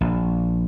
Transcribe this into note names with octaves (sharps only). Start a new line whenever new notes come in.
A#1